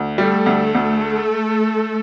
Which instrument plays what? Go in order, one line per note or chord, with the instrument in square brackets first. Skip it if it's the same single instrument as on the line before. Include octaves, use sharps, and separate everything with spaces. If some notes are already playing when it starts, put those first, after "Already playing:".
Already playing: [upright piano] D2
[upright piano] G3 [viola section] A3 A4
[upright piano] D2
D2